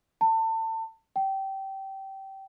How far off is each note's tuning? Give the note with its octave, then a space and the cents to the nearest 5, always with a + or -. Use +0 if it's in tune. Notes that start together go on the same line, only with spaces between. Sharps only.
A5 +30
G5 -20